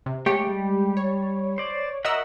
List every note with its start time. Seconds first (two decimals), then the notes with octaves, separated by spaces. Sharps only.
0.06 C3
0.26 G#3 A3 G4 C#5 G5
0.47 G3
0.97 C#5
1.58 C5 D5
2.05 F#4 A#4 D#5 E5 F#5 E6